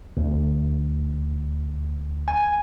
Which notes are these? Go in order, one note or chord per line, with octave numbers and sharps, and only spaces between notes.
D2
G#5